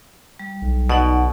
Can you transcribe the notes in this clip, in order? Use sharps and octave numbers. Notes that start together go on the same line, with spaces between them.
G3
B1
B2 D#4 D5 F#5